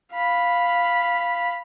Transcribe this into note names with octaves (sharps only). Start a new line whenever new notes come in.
F5 B5